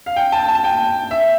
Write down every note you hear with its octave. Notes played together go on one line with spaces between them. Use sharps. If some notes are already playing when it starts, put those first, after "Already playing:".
F5
G5
A5
A5
G5
E5